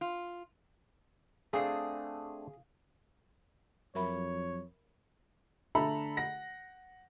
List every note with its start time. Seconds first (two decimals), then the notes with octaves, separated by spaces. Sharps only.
0.01 F4
1.53 A3 C4 D4 G#4 F5 C7
3.95 F2 F#3 A#4 C#5 E5 B5
5.75 D3 A3 A4 E5 A#5 B5
6.17 F#5 A#6